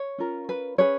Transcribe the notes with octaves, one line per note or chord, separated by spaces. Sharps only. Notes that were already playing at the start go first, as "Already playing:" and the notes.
Already playing: C#5
C#4 F4 A#4
B4
C#4 G#4 B4 C#5